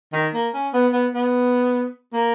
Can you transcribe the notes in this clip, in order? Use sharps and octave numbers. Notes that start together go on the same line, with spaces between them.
D#3
A#3
C#4
B3
B3
B3
A#3